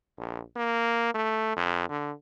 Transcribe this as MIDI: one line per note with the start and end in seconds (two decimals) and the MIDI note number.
0.18 0.41 34
0.56 1.14 58
1.15 1.53 57
1.56 1.87 41
1.89 2.11 50